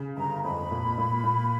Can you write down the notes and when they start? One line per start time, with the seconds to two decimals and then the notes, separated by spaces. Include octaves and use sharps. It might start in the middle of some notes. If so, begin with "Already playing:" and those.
Already playing: C#3
0.16 G1 A#5
0.43 F2 B5
0.71 A#2
0.98 A#2
1.24 A#2